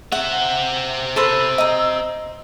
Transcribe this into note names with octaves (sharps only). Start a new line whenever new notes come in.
C4 E5 F#5
A4 B4 C5 E6
D#5 A#5